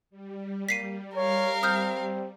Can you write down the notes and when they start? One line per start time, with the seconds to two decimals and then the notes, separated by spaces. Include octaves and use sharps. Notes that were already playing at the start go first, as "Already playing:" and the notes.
0.10 G3
0.69 A#3 B6 C7 D#7
1.16 A#4 C#5 F5
1.63 C4 D#6 F6 G6